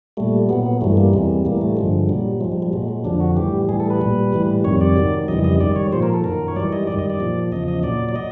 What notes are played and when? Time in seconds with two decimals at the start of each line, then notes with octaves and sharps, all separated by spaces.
0.17 A#2 G3 A3
0.49 A#2 F#3 B3
0.66 B3
0.81 G2 E3 G3 A3
0.97 A#3
1.13 E2 C3 E3 G3 G#3
1.45 A2 E3 G3 A#3
1.61 A3
1.77 G2 D3 F3 G#3
2.09 A#2 F#3 G3
2.41 F3 G#3
2.44 G#2
2.52 G3
2.62 G3
2.73 A#2 F#3 G#3
2.88 G#3
3.04 F2 D3 F3 D4
3.20 F#4
3.36 A2 E3 G3 G4
3.69 A2 E3 G3 G#4
3.80 A4
3.90 B4
4.01 A#2 G3
4.33 A2 E3 G3
4.64 F2 C3 D#3 G3 C#5
4.81 D5
4.97 G#2 D#3 F#3
5.28 F2 C#3 E3 G3 D#5
5.44 D#5
5.60 G#2 D#3 G3 D5
5.76 C#5
5.92 A#2 F3 C5
6.03 A#4
6.14 A4
6.24 F#2 D#3 F#3 A#4
6.48 C#5
6.56 G#2 E3 G3 D5
6.73 D#5
6.87 G3 D5
6.90 F#2 D#3
6.99 D#5
7.10 D5
7.20 A#2 F3
7.52 E2 C#3 F3 D#5
7.68 D#5
7.83 A#2 F#3 D5
8.09 D5
8.15 F#3 D#5